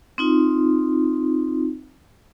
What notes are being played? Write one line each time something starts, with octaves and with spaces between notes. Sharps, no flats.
C4 D#4 F4